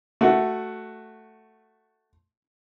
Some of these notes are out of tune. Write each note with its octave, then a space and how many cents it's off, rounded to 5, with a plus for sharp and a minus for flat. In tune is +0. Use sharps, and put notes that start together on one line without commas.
A3 +0 F#4 +5